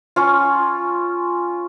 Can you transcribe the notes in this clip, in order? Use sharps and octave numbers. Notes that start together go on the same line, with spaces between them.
C#4 F4